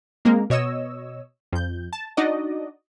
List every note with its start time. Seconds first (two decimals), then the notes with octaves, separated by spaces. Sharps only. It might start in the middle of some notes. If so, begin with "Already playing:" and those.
0.25 G#3 A#3 C4 A#4
0.50 B2 C#5 D#5 E6
1.53 F2 G6
1.93 A5
2.17 D4 D#4 F#4 D5 D#5